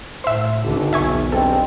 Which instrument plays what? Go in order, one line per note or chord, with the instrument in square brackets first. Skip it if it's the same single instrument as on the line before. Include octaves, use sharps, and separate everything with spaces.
[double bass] A2 [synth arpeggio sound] C5 E5
[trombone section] G#1 [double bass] C#2 D3
[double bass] B1 E2 [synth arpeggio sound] E5 G#5 C#6
[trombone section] G2 G#3 C4 [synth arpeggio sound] A4